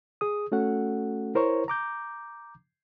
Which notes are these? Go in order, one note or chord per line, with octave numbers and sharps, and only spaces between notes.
G#4 D#6
A3 C#4 F#4 A4 F#5
E4 A#4 C5 C#5 A#5 C#6
A#5 D6 G6